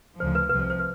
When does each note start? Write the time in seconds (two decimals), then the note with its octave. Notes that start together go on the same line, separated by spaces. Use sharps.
0.20 D2 C#3 F3 C5
0.35 B4
0.49 C2 C3 F3 B4
0.59 C5
0.70 C5
0.79 B4